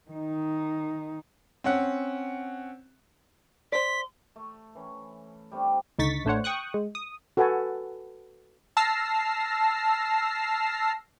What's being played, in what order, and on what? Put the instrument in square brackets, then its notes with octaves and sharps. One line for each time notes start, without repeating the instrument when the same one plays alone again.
[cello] D#3 D#4
[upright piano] C4 C#4 F#5
[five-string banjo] C5 D5 [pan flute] C6 [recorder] B6
[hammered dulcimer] A3
E3 C#4
G3 A3 C4 D4
[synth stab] C#2 D3 D#4 C#6 A6 B6
A1 A3 D4 C5 C#5 F#5
G5 C#6 D#6 F#6
G#3
D#6
[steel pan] F#4 A4 B4 F#5 G#5 A5
[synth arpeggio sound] A5 E6 F6 A#6 C7